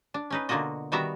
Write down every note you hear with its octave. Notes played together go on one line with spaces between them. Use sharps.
D4
C#4 D#4 B4
B2 D3 A#3 F4 F#4 D#5
D#3 G3 B3 F#4 E5 A#5